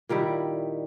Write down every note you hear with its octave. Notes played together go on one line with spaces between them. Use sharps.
A#2 D#3 G3 E4